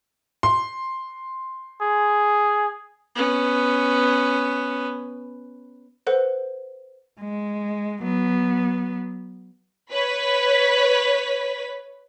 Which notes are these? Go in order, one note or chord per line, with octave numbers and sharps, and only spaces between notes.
C6
G#4
B3 C#4
A4 B4 C5 F#5
G#3
F#3 B3
B4 C#5 B6